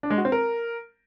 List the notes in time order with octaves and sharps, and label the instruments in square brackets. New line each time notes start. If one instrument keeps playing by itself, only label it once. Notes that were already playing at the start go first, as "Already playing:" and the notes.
[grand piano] D4
G#3
F#4
C4
A#4